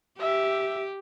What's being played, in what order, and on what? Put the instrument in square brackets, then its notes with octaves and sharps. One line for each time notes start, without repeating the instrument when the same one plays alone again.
[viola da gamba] G4 [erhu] E5